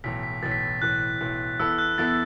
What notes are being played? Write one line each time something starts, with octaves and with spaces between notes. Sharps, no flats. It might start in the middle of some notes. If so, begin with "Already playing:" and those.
B1 A2 E3 B6
B6
B1 A2 E3 A6
B6
A6
B1 A2 E3 F#6
B1 A2 E3
E2 E3 B3 E4 A4 E6
F#6
E2 E3 B3 E4 A4 A6